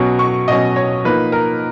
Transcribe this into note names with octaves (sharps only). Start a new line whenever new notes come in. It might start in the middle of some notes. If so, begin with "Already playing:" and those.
Already playing: B2 F#3 C#4
C#6
B2 F#3 C#4 D#5
C#5
F3 A#3 D#4 B4
A#4